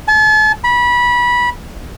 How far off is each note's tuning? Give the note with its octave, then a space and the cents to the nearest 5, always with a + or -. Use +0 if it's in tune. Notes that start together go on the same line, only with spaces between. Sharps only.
A5 -40
B5 -25